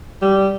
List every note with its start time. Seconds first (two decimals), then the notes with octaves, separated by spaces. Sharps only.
0.22 G3